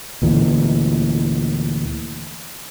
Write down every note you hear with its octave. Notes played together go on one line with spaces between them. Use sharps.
D2 A#2 E3